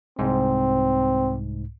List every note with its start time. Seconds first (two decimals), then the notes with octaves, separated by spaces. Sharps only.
0.19 C2 G#2 C4